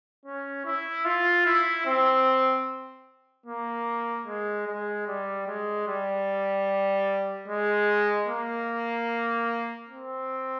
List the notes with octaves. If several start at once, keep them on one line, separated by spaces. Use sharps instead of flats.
C#4
E4
F4
E4
C4
A#3
G#3
G#3
G3
G#3
G3
G#3
A#3
C4